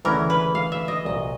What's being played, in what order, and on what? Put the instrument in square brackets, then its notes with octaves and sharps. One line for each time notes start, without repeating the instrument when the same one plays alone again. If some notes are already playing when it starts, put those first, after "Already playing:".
[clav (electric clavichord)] D2 C#3 E3 A3 C#4 [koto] A#4
[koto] B4
F5
E5
D#5
[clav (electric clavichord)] C2 A#2 F#3 [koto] D#5